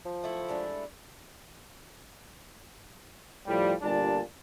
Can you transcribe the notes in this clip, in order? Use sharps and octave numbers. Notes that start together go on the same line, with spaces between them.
F3
A3 E4
G3 G#3 D4
A2 F3 G3
G1 A#2 G3 D4 A5